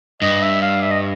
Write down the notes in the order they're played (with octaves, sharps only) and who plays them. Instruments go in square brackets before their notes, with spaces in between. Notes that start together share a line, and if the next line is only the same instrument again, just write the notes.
[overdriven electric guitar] G2 [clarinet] D#5
[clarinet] E5
F5
E5
D#5